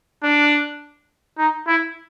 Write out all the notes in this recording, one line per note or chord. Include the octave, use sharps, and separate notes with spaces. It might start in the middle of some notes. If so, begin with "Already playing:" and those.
D4
D#4
E4